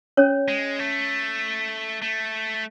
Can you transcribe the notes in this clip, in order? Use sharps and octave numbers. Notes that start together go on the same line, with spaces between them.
C#4 C#5
G#3
A3
A3